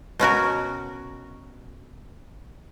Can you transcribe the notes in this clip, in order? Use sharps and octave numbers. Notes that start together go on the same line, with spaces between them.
B2 C#4 F#4 A#4